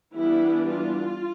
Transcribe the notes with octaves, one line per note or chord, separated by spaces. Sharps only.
E3 G3 B3 D4 E4
F4